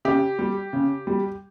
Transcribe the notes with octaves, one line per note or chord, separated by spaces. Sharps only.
C#3 G4
G3
C#3
G3